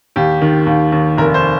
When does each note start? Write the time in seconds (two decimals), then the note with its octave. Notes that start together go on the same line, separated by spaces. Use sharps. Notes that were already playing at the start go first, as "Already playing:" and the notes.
0.16 D#2 G4
0.42 D#3
0.67 D#2
0.92 D#2
1.18 F1 A#4
1.34 C5